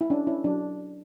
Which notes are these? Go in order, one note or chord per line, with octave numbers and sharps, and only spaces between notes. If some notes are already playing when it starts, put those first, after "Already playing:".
E4
C#4 D4
C#4 E4
F#3 D4